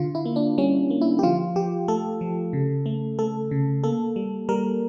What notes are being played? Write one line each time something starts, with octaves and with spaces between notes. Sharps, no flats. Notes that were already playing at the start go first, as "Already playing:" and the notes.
Already playing: D3 F4
E4
A#3
D4
G3 C#4
A#3
E4
G4
F3 F4
F3 G4
A3 A4
F3
C#3
A3
A3 A4
C#3
A#3 A4
G3
G3 A#4